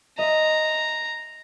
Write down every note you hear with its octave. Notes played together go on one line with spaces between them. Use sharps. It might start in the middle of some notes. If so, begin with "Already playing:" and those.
D#5 E5 A#5 C6